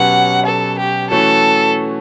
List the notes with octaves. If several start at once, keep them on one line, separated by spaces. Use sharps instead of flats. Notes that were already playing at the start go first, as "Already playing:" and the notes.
Already playing: B2 F#3 C#4 G4 B4 F#5
A4
G4
E3 A3 C#4 F#4 A4